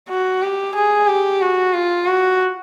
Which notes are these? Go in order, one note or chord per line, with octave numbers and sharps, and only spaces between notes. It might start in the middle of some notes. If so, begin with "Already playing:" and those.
F#4
G4
G#4
G4
F#4
F4
F#4